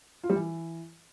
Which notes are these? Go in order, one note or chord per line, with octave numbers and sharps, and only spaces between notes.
F4
G3
E3